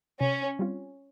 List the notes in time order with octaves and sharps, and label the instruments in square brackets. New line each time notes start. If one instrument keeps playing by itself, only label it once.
[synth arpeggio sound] C3 [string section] C#4
[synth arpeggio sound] G3 C4 F4